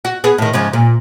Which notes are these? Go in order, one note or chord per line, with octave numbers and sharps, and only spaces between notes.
F#4
B3 G#4
A2 D#3
G#2 C#3 F3
A#2